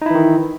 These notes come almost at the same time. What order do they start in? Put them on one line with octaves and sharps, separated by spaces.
D#4 E4 E3 D#3